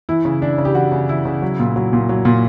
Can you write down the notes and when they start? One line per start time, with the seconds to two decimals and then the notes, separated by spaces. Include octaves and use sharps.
0.09 E3 E4
0.25 C#3
0.42 E3 D4
0.58 C#3
0.65 G4
0.75 E3 F#4
0.92 C#3
1.09 E3 E4
1.25 C#3
1.42 F#3
1.59 A#2
1.76 F#3
1.93 A#2
2.09 F#3
2.25 A#2